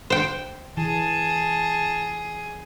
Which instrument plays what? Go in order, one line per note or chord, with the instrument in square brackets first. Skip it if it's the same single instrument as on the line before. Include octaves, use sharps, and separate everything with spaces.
[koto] C5 G5
[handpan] E3 [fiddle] G#4 [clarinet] A5